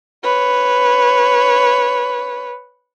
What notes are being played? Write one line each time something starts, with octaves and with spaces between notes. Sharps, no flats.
B4 C#5